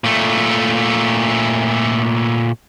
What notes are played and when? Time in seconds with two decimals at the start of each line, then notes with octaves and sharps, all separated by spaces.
0.04 A#2 A3